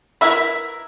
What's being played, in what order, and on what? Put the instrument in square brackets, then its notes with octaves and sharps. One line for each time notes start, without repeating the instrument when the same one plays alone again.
[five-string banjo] E4 A#4 B4 E5 B5